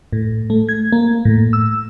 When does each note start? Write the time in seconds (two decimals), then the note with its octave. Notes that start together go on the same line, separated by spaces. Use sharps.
0.13 A2
0.50 A3
0.69 G#6
0.92 A#3
1.25 A2
1.53 E6